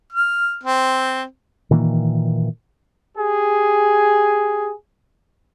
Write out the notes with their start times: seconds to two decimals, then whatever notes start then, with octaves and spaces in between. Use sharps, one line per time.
0.13 F6
0.64 C4
1.71 A#2 D#3 E3 A#3
3.17 G4 G#4